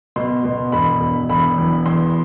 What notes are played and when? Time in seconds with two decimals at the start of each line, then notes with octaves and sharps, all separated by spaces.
0.16 B2 C6
0.45 B2
0.72 E1 B5
1.01 E1
1.29 E1 B5
1.58 E2
1.86 E2 C6